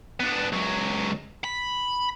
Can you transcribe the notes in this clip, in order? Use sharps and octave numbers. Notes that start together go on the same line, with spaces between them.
B3 D4
C#2 F#3
B5